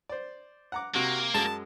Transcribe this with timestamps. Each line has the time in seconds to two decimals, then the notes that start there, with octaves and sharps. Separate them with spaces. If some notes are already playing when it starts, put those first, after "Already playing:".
0.09 C5 D5
0.72 F#5 A#5 D6
0.95 C3 A#3 F#4
1.34 F#2 G#3 A5